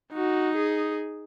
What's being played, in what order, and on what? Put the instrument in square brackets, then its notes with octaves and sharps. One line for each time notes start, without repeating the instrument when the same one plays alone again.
[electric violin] D#4 [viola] F#4
[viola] G#4